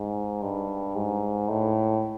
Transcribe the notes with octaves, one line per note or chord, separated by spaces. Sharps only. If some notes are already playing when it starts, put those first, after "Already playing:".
Already playing: G#2
G2
G#2
A2